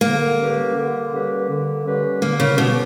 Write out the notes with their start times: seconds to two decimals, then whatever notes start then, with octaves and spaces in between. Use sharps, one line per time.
0.01 D3 A#3
0.39 G3 C#4 G4 B4
0.75 D3
1.12 G3 C#4 G4 B4
1.48 D3
1.84 G3 C#4 G4 B4
2.22 D3 A#3
2.40 C#3
2.58 B2 G3 C#4 G4 B4